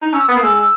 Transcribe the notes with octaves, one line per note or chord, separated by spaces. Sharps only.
D#4
C#4 E6
B3 D#6
A#3
G#3 E6
E6